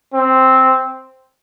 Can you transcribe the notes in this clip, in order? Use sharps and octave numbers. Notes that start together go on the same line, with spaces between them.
C4